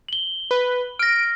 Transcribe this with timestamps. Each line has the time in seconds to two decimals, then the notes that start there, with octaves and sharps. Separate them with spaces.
0.09 F#7 G7
0.51 B4
0.99 F6 A#6 D7